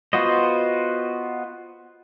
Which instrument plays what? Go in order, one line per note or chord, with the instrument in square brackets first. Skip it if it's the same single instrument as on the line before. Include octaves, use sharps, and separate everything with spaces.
[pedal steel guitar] B3 F4 F#4 C5 D#5